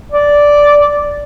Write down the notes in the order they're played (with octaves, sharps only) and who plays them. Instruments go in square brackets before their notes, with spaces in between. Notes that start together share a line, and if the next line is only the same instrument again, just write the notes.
[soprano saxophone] D5